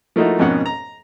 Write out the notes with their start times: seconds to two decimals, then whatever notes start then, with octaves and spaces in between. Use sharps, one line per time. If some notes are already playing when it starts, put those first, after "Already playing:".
0.16 F3 A3 A#3 D#4 E4 F#4
0.39 F2 G#2 B2 C#4 A#4 F#5
0.66 A#5